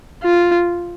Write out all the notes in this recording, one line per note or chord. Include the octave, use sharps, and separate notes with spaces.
F4